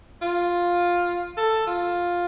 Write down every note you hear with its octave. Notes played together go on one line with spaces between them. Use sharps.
F4
A4
F4